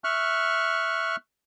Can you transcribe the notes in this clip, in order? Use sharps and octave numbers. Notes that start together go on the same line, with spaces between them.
E5 C#6 F6 F#6